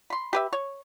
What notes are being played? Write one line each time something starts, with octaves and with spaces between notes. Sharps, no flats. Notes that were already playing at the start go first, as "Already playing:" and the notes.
B5 C6
G4 B4 E5
C#5